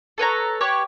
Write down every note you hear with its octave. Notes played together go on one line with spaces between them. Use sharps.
A4 B4 C#5 A#5
G4 B4 C#5